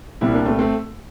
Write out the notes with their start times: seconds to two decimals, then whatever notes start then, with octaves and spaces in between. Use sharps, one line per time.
0.21 C2 A#2 G3 C4 E4
0.34 A#3 D4
0.46 A3 C4
0.59 A3 C4